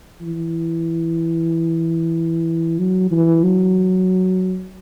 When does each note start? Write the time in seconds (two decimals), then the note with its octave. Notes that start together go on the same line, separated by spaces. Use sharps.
0.21 E3
2.79 F#3
3.11 E3
3.44 F#3